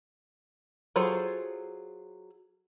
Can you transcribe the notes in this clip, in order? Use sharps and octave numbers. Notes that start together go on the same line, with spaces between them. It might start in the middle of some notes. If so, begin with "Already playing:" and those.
F#3 F4 G#4 A4 C5